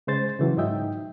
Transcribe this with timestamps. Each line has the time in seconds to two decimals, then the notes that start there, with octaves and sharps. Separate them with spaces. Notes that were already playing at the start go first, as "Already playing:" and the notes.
0.07 C#3 G#3 C5 A6
0.39 C#3 E3 F#3
0.57 G#2 F#3 D#4 D#5 E5 G5